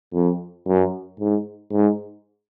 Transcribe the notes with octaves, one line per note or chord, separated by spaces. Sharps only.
F2
F#2
G#2
G#2